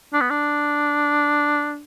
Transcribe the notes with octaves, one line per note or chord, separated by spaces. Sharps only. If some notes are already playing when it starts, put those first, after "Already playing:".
D4
B3
D4